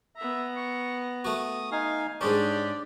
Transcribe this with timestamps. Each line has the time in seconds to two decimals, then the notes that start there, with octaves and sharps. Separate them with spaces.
0.17 B3 E5 A#5
0.57 C#6
1.25 A3 F#4 D#6
1.72 D#4 F5 G#5
2.21 G#2 G#3 C#4 D4 G4 D5